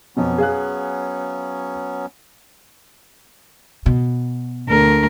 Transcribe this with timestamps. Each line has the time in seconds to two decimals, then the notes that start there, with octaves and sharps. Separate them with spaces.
0.17 F2 B2 F#3 B3 C#4
0.38 G#4 F5 F#6
3.86 B2
4.68 D2 A#4